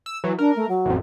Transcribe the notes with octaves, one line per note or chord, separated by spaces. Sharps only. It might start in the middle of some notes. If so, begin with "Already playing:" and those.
E6
E3 F#3
D4 A#4
A3
F#3
A1 F2